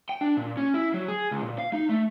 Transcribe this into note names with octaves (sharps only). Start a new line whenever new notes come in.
G5
D4
A#2
C#4
E4
F#3
G#4
C#2
A#2
F5
D#4
A3